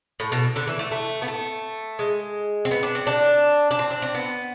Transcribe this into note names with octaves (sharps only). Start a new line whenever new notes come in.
A2
B2
D3
E3
A3
A3
B3
A3
G#3
C4
B3
D4
C4
D4
D4
C4
D4
C4
B3